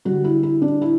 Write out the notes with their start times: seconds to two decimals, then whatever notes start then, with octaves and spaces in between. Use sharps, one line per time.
0.05 D3 G3 F#4
0.24 E4
0.43 E4
0.62 D4
0.82 E4